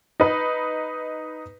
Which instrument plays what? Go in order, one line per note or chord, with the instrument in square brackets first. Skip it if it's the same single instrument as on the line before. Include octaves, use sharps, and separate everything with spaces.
[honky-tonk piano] D#4 B4